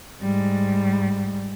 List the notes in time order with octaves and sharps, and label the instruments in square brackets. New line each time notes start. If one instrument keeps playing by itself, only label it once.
[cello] G#2 G3